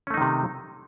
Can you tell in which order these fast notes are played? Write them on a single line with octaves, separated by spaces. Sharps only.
C#4 A3 D#4 D#3 C3